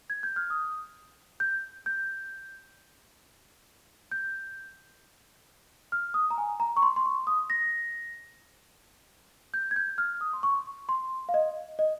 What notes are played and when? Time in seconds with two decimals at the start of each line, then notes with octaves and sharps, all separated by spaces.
0.10 G#6
0.23 G6
0.36 F6
0.50 D#6
1.40 G6
1.86 G6
4.12 G6
5.92 F6
6.14 D#6
6.31 A#5
6.38 G#5
6.60 A#5
6.76 C#6
6.82 C6
6.96 C6
7.05 C#6
7.27 D#6
7.50 A#6
9.54 G6
9.71 G#6
9.76 G6
9.98 F6
10.21 D#6
10.33 C6
10.43 C#6
10.89 C6
11.29 F5
11.34 D#5
11.79 D#5